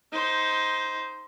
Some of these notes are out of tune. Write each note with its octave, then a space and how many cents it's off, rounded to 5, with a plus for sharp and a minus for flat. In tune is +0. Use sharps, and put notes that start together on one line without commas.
D#4 +20 C5 -5